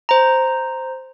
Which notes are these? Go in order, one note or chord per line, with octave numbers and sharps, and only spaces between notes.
C5 A#5